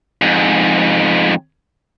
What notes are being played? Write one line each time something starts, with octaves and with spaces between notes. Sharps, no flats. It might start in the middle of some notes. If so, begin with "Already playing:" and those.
F2 G#2